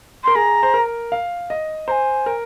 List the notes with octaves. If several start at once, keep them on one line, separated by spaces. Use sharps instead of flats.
A#4 C6
G#4 A#5
C5
A#4
F5
D#5
C5 G#5 A#5
A#4